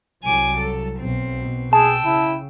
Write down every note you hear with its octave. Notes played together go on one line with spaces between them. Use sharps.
C2 F#3 G#5 D6
A4
B1 C4
B2
G#4 G5 A5 E6
C#3 E4